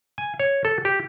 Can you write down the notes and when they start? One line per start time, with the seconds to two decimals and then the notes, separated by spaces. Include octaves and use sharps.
0.18 G#5
0.39 C#5
0.65 A4
0.85 G4